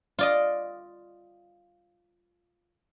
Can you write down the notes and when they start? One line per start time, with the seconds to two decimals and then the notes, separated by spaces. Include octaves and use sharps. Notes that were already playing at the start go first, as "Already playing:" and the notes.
0.19 F4 D5 D#5